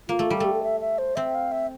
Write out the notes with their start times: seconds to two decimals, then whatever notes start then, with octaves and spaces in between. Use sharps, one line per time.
0.08 A#3 F4
0.19 A3
0.30 G3 A4
0.40 A3 G4
0.53 A4
0.63 E5
0.80 E5
0.98 C5
1.16 C4 E5
1.35 F5
1.52 E5